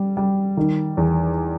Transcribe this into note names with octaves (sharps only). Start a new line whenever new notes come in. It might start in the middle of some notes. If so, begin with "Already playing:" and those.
Already playing: G3
G3
D#3
E2